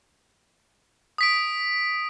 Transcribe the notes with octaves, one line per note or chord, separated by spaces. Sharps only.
D#6 B6 D7